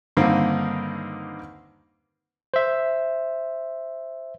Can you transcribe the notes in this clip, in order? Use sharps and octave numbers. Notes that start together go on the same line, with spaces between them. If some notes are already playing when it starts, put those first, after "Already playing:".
G2 D3 D#3 A#3 C4
C5 E5